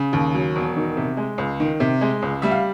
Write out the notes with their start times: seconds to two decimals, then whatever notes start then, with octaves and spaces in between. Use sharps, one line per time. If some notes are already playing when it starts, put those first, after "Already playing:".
Already playing: C#3
0.13 D#2
0.34 F#3
0.55 E1
0.77 D#3
0.97 C3
1.17 G#3
1.38 C#2
1.60 D#3
1.80 C3
2.01 G#3
2.22 C#2
2.42 G3 E5
2.51 F5